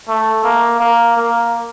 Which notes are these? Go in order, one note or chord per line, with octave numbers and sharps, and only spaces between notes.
A3
A#3
A#3
A#3